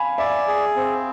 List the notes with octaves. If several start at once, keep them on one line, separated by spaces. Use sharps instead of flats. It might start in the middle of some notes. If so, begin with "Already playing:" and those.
Already playing: F5 G#5 B5
D5 E5 G#5
G#4
C4